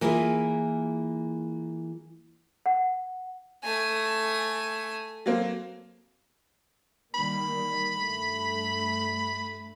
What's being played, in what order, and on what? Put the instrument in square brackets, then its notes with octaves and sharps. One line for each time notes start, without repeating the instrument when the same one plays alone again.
[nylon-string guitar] E3 A#3 E4 F4 G#4
[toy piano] F#5
[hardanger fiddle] A3 G#5
[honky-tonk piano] F#3 A#3 C4
[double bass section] D#3 G3 A#3 [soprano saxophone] B5
[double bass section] G2 A3